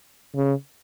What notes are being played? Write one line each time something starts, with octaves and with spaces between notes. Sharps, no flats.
C#3